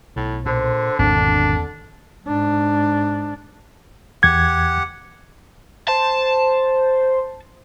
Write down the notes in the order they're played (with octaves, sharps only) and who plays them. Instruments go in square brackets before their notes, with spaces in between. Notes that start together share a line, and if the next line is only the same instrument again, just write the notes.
[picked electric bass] B1 [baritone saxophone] A2
[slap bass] A#2 [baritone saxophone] D3 [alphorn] C5
[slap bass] G#1 B2 D#3 [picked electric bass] E2 A#3 C4 [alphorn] D3 [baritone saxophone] D4
[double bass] G#2 D4
[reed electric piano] E2 G#6 [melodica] G4 F#5
[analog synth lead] C5 [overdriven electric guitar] A5